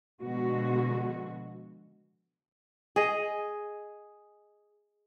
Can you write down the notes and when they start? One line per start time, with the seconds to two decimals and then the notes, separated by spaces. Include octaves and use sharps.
0.22 B2 D3 F3 G#3 F#4
2.96 G#4 D#5